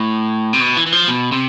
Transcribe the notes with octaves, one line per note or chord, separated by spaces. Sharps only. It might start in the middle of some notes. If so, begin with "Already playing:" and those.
Already playing: A2
C3
B2
E3
E3
F3
B2
C3